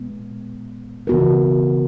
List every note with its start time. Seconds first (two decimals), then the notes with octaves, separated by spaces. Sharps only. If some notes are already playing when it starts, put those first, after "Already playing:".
Already playing: A#2 G#3 B3
1.07 C#3 E3 B3 F#4 A#4